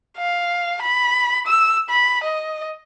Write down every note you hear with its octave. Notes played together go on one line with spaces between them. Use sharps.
F5
B5
E6
B5
D#5